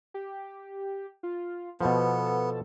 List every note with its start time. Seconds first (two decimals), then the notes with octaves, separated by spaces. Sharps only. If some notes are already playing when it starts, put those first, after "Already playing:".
0.14 G4
1.23 F4
1.81 B2 F3 B3 A4